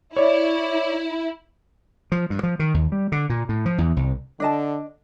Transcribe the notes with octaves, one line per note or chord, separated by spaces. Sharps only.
E4 C#5 D5
F3
G2
F3
D#3
D#2
G3
D3
A#2
A2
F3
E2
C2
D3 D4 D#5 A5